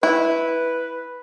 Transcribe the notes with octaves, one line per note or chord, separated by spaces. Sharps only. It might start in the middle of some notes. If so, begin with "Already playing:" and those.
E4 B4